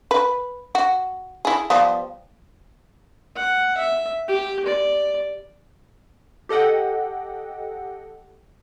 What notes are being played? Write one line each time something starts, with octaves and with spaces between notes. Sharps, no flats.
B4
F#4
E4 G#4
F3 G3 B3
F#5
E5
G4
D5
G4 A4 D#5 F#5 G5